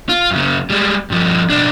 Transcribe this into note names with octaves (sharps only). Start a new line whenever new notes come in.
F4
F#2 C#3
G3 G#3
G2 F3
B1 D4